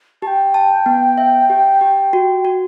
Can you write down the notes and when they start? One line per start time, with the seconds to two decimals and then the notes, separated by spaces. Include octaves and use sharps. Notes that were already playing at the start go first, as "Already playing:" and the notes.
0.22 G4 A5
0.27 G5
0.54 A5
0.86 B3
1.18 E5
1.50 G4
1.81 G4
2.13 F#4
2.45 F#4